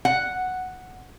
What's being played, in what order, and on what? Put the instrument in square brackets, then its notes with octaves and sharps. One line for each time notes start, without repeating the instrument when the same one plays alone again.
[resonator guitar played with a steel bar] F#5